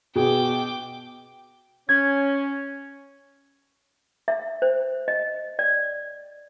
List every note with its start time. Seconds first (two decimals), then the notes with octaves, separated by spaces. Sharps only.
0.16 B2 B3 G#4 G5 D6
1.89 C#4 G#6
4.28 E5
4.62 C5
5.08 D#5
5.59 D5